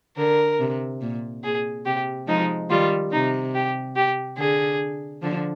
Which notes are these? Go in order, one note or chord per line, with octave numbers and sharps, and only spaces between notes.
D3 A#4
C3
A#2
A#2 G#4
C3 G4
F3 G#3 D#4
D#3 G3 F4
C3 D#4
G4
G4
D3 G#4
D3 F3